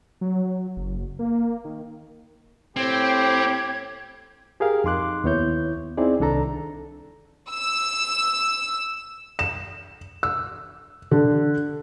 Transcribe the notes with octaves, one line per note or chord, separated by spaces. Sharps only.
F#3
F#1
A#3
D#3
A2 C4 G4 G#6
G4 G#4 A#4 F5
F2 D#4 C6 D6 F#6
D#2 B3 E4 C#5 G6
C4 D#4 E4 G#4 D5
C2 D#3 D4 A4 A#5
E6
E7
E6
D3